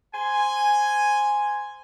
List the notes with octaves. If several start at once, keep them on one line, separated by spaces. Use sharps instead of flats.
C5 G#5